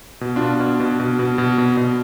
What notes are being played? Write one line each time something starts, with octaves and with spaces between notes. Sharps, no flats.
B2
B2 D4 F4
B2
B2
B2
B2
B2
B2
B2